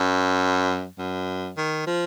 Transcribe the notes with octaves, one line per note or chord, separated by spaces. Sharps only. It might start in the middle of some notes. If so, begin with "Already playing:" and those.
Already playing: F#2
F#2
D#3
F3